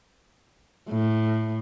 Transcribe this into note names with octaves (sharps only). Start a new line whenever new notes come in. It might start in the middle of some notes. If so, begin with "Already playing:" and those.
A2